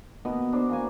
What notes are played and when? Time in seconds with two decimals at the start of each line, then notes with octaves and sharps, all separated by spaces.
0.25 B2 D#3 B3 D#5
0.53 D4 C5
0.69 E3 A#3 F#4 G#5